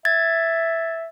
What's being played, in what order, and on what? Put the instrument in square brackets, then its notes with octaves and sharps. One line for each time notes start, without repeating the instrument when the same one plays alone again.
[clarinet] E5 [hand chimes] G#6 A6